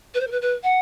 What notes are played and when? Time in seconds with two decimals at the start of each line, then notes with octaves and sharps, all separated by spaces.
0.14 B4
0.20 C5
0.27 A#4
0.31 B4
0.41 B4
0.63 F#5